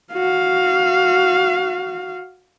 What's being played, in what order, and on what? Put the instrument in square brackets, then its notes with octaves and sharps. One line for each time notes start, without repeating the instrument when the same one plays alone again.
[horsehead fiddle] F#4 F5